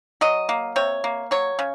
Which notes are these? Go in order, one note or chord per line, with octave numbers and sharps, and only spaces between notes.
F#3 D#5
A#3
C3 C#5
A#3
F#3 C#5
C#3